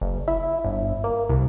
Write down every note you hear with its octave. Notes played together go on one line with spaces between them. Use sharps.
F#1
E4
G1
A#3
C2